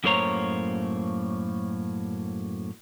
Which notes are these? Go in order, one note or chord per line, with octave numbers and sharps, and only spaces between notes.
F#2 A2 A#3 C5 C#5 A#5